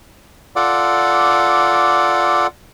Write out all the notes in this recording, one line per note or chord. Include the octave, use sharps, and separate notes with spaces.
F4 A4 D5 F#5 D6